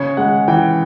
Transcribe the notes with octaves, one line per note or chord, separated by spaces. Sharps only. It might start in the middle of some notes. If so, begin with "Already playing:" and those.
Already playing: C#3 C#5
G#3 F#5
E3 G5